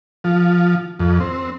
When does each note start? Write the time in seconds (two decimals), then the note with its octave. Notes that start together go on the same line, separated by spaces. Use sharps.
0.24 F3
0.99 F2
1.20 C4